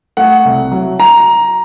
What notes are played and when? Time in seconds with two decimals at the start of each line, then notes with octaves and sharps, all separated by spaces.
0.17 A3 F#5
0.45 C2
0.71 F#3
1.00 A#5